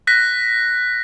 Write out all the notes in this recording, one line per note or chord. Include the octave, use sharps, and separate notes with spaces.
F#6 A#6 B6